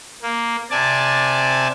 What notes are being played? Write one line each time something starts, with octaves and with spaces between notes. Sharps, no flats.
A#3
C3 D5 G#5 A5